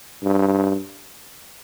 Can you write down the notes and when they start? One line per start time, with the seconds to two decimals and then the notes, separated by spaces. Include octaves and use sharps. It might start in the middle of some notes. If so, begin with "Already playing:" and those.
0.24 G2